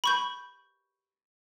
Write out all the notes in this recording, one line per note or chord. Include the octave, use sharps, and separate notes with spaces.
B5 C#6 G6